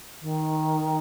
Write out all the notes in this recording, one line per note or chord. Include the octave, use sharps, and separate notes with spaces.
D#3